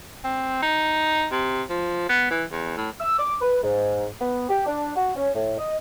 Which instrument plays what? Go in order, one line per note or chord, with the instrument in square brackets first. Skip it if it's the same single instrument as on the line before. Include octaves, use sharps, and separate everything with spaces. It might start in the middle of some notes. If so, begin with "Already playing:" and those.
[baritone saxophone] C4
D#4
C3
F3
B3
E3
E2
A2
[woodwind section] E6
D6
B4
G#2
B3
G4
D4
F#4
C#4
A2
D#5